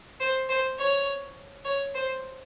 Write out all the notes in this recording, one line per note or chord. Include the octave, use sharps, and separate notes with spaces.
C5
C5
C#5
C#5
C5